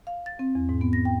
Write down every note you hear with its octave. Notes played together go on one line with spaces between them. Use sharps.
F5
A6
C4
E2
G#2
B3
A#6
G5